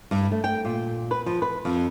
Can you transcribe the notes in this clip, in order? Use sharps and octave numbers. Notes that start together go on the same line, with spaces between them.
G2
A3
G5
A#2
B4
F3
B4
F2